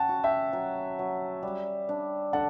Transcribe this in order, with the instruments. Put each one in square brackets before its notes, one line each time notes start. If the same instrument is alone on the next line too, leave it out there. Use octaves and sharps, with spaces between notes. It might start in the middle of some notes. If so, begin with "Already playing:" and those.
Already playing: [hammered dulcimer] C#4 [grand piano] F#5 G5 A5
[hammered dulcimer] F#4
[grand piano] E5 G5
[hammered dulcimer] F#3
F#3
G3
D4
[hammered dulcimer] D3 [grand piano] F#5 A5